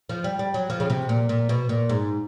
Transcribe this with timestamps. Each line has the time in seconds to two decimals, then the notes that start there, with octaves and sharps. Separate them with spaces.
0.09 F3
0.24 G3
0.39 G3
0.54 F#3
0.70 F3
0.80 C#3
0.90 C3
1.09 A#2
1.29 A#2
1.49 B2
1.69 A#2
1.89 G#2